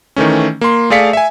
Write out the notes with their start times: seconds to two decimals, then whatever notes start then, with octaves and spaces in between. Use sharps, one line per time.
0.16 D#3 E3 A3 C#4
0.61 A#3 C6
0.90 A3 G#4 D5 F5 B6 C#7
1.13 E5 G#5